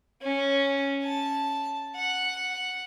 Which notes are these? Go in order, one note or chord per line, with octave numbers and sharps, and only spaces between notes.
C#4
A5
F#5